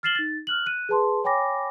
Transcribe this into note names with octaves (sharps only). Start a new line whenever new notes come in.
F6 A6 C7 E7 F#7 G7
D#4 A6
F6 F#6 F#7
F#6 D#7
G#4 B4 A5 C6
C#5 G5 G#5 B5 D6 A#6